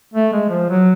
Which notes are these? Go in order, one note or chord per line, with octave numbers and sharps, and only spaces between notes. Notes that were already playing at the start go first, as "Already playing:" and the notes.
A3
G#3
F3
F#3